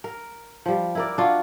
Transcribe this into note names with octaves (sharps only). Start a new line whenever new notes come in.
A#4
F3 G3
E4 A#4 D5
D4 F4 F#4